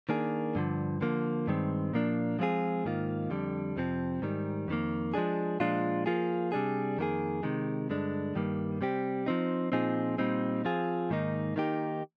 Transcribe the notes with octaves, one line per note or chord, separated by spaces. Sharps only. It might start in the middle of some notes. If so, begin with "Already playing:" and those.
D#3 A#3 D4 G#4
G2 D3 F3
D3 F3 A#3
G2 D#3 G#3 C4
A#2 F3 A#3 D4
F3 G#3 C4 F4 G#4
G#2 D#3 A#3 F4
F2 D3 G3
F2 C3 F3 C4
G#2 D#3 G3
F2 D#3 A#3
F3 G#3 D4 G#4
A#2 F3 G#3 D4 F4
F3 A#3 F4 G#4
C3 G3 D4 G#4
F2 D#3 A#3 F4 G#4
C3 D#3 G#3
G2 D3 G#3 D4
G2 D#3 G3 A#3
C3 G3 C4 G4
F3 C4 D#4
A#2 F3 C4 D#4 G#4
A#2 G3 C4 D#4
F3 C4 F4 G#4
G#2 D#3 A#3 D#4
D#3 A#3 D#4 G4